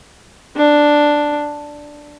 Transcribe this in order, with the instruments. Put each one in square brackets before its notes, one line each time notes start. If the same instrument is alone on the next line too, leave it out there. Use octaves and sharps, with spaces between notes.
[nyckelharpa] D4